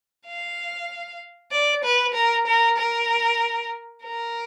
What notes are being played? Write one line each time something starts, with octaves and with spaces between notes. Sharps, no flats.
F5
D5
B4
A#4
A#4
A#4
A#4